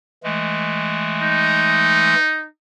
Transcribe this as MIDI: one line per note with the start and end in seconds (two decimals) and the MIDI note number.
0.23 2.14 52
0.23 2.14 56
0.23 2.14 57
1.22 2.46 63